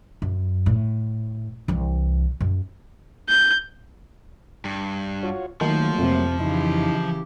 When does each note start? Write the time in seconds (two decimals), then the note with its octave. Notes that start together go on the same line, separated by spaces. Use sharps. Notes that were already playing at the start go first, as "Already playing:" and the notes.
0.22 F#2
0.66 A2
1.68 C2 E3
2.40 F#2
3.29 G6
4.65 G2
5.23 F4 F#4 C#5
5.61 D#3 F3 F#3 A3 A#3
5.99 F2 C3
6.40 C#3 E3 D#4 E4 G4